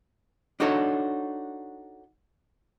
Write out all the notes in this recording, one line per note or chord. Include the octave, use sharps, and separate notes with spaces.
D4 D#4 F#4 A4 C#5